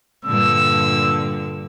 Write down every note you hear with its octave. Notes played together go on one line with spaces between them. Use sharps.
G2 A#2 D3 E6